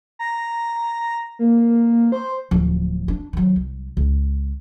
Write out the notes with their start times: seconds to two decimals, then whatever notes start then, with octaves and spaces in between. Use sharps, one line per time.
0.19 A#5
1.39 A#3
2.12 C5
2.51 D1 F3
3.08 D4
3.33 D#3 F#3
3.56 C2
3.97 C#2